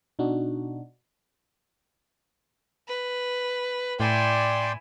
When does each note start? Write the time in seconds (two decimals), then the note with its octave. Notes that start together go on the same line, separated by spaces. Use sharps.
0.19 B2 D4 D#4 F#4
2.88 B4
4.00 A2 E4 D5 G5 G#5 C6